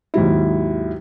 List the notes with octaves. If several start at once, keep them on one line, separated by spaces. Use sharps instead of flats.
D#2 G#2 F#3 E4